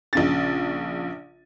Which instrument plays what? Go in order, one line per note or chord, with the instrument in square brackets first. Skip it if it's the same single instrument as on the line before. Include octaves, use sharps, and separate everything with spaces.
[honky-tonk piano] A#1 C#3 A6